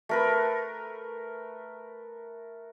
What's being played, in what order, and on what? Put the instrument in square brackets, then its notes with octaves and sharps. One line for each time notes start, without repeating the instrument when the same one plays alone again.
[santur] A3 A#4 B4